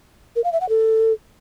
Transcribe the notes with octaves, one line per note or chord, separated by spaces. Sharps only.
A#4
F5
E5
F#5
A4